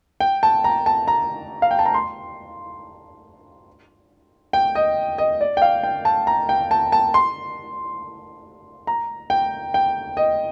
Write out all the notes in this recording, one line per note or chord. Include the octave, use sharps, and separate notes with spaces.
G5
A5
A#5
A5
A#5
F5
G5
A5
A#5
C6
G5
D#5
D#5
D5
G5
F5
G5
A5
A#5
G5
A5
A5
C6
A#5
G5
G5
D#5